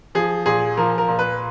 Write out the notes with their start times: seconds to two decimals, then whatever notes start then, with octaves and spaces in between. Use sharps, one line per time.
0.15 F3 G#4
0.46 A#2 G#4
0.77 F3 A#4
0.98 A#4
1.08 A#2
1.19 B4